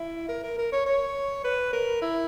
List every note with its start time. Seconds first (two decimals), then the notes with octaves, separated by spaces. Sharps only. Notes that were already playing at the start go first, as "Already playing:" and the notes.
Already playing: E4
0.28 A#4
0.43 A#4
0.58 A#4
0.72 C#5
0.86 C#5
1.44 B4
1.73 A#4
2.02 E4